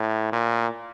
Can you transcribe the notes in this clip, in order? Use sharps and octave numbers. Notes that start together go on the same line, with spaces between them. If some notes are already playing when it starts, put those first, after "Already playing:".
Already playing: A2
A#2